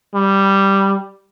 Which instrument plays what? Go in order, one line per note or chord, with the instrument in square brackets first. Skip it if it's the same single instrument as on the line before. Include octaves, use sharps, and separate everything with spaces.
[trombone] G3